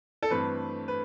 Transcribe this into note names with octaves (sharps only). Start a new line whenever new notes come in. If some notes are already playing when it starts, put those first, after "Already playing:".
A4
G2 E3 A3 C4 B4
B4